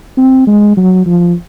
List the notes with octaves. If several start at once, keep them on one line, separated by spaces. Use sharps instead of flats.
C4
G#3
F#3
F3